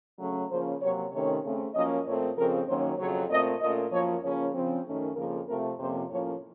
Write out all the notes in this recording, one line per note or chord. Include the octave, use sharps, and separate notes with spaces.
C#3 F#3 A3 C#4
C#3 F3 A#3 C#4 C5
C3 F#3 A#3 C#5
C3 D#3 A3 C#4 C#5
C#3 A3 C4
F#2 F3 A#3 C#4 D#5
A#2 A3 C4 C#5
F2 C#3 F3 C4 A#4
F#2 D#3 F#3 A#3 C#4 C5
F2 C#3 F#3 C#5
A#2 A3 C4 D#5
A#2 A3 C#4 D#5
F#2 F3 A#3 C#5
C#3 F3 A#3 C#4 C#5
C#3 F3 C4
F#2 D#3 A3 C#4
F2 C#3 F3 A#3 A#4
C3 F3 A3 C4 A#4
F2 C3 F3 A#3 C#4 C5
A2 F3 A#3 C#4 C#5